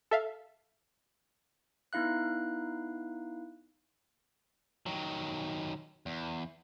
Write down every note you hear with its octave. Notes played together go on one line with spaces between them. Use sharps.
A4 E5 F5
B3 D#4 E4 F5 F#6
D#3 F#3
E2